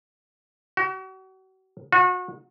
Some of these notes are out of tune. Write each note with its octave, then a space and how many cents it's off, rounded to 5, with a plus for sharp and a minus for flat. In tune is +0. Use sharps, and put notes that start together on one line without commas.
F#4 +40
F#4 -30